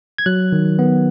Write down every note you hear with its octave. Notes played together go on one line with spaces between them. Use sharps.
G#6
F#3 F#6
D#3
B3